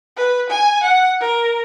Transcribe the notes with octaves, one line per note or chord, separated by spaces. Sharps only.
B4
G#5
F#5
A#4